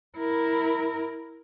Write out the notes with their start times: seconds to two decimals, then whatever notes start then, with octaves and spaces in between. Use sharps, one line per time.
0.18 E4 A#4